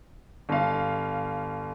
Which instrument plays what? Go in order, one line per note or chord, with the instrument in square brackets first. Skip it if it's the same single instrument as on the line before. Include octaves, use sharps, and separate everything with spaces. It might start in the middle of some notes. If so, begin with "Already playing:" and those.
[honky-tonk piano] G1 F5